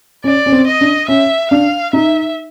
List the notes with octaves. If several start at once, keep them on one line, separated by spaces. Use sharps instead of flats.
C#4 D5
C#4
C4
D#5
D4
C#4 E5
D4 F5
D#4 E5